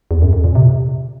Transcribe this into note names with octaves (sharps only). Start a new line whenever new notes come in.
E2
F#2
F2
A#2
C3